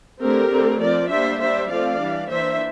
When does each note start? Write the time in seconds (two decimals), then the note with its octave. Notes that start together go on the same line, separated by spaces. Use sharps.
0.21 D3 A3 C4 G4 A#4
0.51 D3 A3 C4
0.81 F3 C4 A#4 D5
1.11 G3 A#3 D4 C5 E5
1.40 G3 D4 C5 E5
1.71 F3 A3 C4 D5 F5
2.00 E3 G3 D4
2.30 E3 A#3 D4 C5 E5